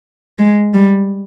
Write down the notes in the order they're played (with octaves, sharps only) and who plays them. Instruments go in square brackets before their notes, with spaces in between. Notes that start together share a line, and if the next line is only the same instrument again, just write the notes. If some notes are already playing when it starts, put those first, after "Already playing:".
[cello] G#3
G3